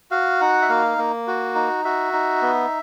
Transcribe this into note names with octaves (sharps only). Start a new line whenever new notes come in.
F#4 F5
D#4 F#5
E5
A#3 F5
A#3
F#4
D#4
F#4 E5
D#4
B3